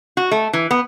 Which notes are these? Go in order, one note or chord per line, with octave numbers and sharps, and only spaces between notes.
F#4
A3
E3
B3